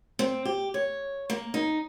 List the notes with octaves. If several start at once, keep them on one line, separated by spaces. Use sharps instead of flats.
C4
G4
C#5
A#3
D#4